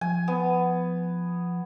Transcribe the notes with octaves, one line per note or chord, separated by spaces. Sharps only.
F3 G#5
B3